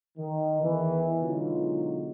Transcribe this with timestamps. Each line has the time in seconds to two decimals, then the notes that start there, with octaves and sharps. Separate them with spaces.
0.18 D#3
0.62 E2 E3
1.22 B2 D3 F#3 G#3 D#4 F4